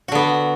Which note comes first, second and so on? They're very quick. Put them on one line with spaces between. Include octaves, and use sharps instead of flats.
F#4 D3 B3